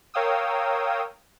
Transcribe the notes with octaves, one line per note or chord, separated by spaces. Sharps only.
A#4 C#5 F5 G5 D#6 E6